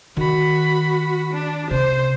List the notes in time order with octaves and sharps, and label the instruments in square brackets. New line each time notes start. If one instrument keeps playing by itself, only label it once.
[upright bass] D#3 [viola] F#4 B5
[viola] D4
[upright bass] C3 [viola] C5